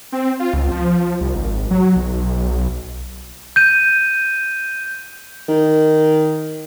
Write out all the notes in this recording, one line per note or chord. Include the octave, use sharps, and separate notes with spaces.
C4
F4
C#2
F3
C2
G#1
F#3
B1
G6 D#7
D#3